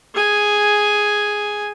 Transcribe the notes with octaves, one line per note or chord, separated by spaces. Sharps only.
G#4 G#5